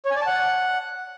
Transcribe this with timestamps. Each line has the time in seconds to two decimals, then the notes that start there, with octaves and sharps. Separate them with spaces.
0.05 C#5
0.11 G#5
0.16 D5
0.21 A5
0.26 F#5